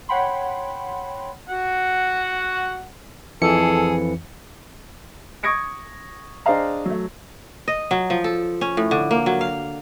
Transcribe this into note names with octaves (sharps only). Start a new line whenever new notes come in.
C#5 F#5 G5 B5 C6
F#4 F#5
F2 E3 G#4 A4 C#7
C#6 D#6 G#6 A#6 C#7 D7
D4 G#4 C5 D#5 F5 A#5
F#3 A3
D#5
F#3
F3
A4
C#4
A2
D3
A#3
F#3
F5